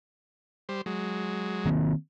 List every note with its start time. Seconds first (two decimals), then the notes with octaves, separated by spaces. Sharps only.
0.69 G3 C5
0.86 F#3 G#3
1.65 D#3 A#3 C4